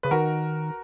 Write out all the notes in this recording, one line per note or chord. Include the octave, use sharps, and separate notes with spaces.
C#3 B4
D#3 F#4 A#4